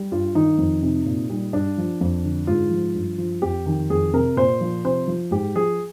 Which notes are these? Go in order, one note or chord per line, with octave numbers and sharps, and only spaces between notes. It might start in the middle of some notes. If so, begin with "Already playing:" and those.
Already playing: G3
G2 F4
D#3 D#4
F2
C3
A#2
G3
G2 D4
F3
F2
D3
G#2 F4
F3
G2
F3
F2 G4
D#3
F2 G#4
C3 A#4
A#2 C5
F3
C3 C5
F3
G#2 G4
F3 G#4